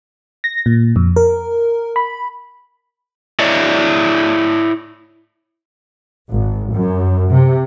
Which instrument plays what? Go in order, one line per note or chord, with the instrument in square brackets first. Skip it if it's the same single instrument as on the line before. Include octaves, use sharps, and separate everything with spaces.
[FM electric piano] A#6
A#2
F2
A#4
B5
[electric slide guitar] E4 C#5 D5 E5
[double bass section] G#1
F#2
C3